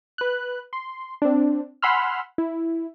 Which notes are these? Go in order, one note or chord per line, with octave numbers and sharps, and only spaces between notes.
B4 F#6
C6
C4 D4
F#5 G#5 B5 C6 E6 F6
E4